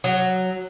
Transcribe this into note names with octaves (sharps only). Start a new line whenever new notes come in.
F#3